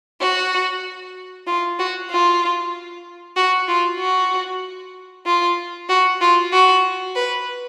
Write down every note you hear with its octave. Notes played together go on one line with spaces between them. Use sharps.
F#4
F4
F#4
F4
F#4
F4
F#4
F4
F#4
F4
F#4
B4